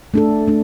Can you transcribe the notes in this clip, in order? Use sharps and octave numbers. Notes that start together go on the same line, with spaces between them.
A3 D4 A4
A3 D4